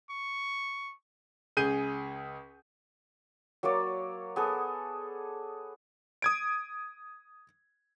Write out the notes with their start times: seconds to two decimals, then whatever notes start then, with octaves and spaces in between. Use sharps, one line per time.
0.10 C#6
1.57 C#2 G#4 G6 D#7
3.63 F#3 A#3 C#5 D5
4.36 B3 G#4 A4
6.22 D#6 G#6 D7